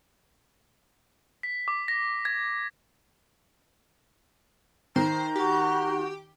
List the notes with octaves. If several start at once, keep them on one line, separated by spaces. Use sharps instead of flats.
B6
D6
A#6
G#6
D#3 C5 A#5
F#4 G4